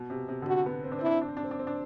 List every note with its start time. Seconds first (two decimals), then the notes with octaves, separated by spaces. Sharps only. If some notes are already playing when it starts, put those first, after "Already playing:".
Already playing: B2
0.10 C3
0.28 C3
0.42 D3
0.46 C3 F#4
0.66 B3
0.84 C4
0.92 D4
0.99 C4
1.02 D4 E4
1.14 C4
1.21 D4
1.28 C4
1.37 D4
1.44 C4
1.51 D4
1.59 C4
1.67 D4